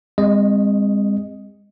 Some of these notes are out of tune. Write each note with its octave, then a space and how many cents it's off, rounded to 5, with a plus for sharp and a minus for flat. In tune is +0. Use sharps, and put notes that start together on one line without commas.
G#3 -40 C4 +0 D#5 +0